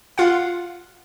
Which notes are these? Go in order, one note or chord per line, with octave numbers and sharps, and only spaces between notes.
F4 F5 F#5